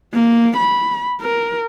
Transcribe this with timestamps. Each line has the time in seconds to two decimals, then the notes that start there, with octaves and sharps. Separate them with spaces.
0.14 A#3
0.57 B5
1.21 A#4